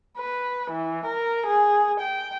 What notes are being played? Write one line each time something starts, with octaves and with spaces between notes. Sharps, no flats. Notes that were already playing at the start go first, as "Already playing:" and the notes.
B4
E3
A#4
G#4
G5